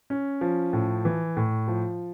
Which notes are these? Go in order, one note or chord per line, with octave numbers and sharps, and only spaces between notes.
C#4
F3
A2
E3
A2
F3